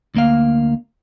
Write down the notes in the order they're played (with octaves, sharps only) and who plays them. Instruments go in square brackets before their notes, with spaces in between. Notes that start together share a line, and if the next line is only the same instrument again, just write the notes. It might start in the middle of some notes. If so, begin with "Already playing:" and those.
[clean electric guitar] D2 A#3 F5